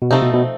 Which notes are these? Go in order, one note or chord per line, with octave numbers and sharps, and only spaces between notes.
B2
C3 F3 A3 C4 D#4
B2
B2